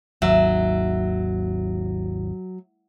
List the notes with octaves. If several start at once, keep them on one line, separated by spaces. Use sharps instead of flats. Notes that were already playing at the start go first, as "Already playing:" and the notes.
G#1 D#2 F#3 E5